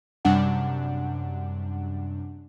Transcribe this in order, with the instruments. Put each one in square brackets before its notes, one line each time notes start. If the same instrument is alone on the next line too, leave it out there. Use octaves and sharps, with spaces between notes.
[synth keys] F#2 C3 G3 D4 F#5